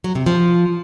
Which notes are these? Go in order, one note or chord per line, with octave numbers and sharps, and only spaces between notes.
F#3
C3
F3